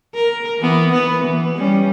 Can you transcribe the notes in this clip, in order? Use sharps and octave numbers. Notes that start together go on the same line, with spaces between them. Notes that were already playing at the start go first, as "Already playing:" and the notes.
A#4
E3 B3
B3 B4
E3
G3 C#4